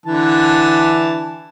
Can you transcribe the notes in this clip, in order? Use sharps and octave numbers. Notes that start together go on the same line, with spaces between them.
D3 E3 A5